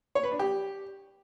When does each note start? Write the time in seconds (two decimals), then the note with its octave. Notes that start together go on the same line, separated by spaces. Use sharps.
0.15 C#5
0.23 B4
0.31 D4
0.39 G4